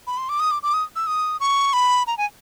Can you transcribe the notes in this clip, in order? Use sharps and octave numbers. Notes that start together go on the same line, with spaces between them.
B5
C6
D6
D#6
D6
D6
D#6
E6
D#6
C#6
B5
A#5
G#5